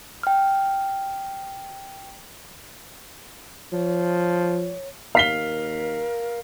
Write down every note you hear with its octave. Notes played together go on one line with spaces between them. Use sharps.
G5 F6
F3 C#5
D#2 A#4 F5 B6 G7